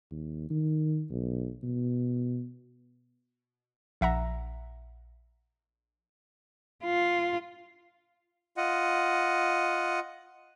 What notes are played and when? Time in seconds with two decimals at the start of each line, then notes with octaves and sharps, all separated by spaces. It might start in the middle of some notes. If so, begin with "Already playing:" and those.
0.11 D#2
0.50 D#3
1.10 B1
1.63 B2
4.01 A#1 E5 F#5 A#5
6.85 F4
8.57 F4 D#5 F#5